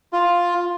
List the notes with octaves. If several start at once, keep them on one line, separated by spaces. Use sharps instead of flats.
F4